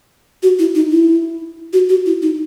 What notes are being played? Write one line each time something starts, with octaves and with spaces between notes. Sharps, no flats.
F#4
E4
D#4
E4
F#4
F#4
E4
D#4